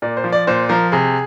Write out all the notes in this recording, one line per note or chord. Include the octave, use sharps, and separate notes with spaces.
A#2 D5
C5
F3
D5
A#2 C5
F3 A#4
C3 G#4